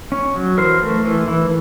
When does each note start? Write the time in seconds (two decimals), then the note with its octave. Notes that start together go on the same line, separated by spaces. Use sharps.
0.12 C#4
0.35 F#3
0.58 E3 A#4 C5
0.82 A3
1.04 E3
1.28 E3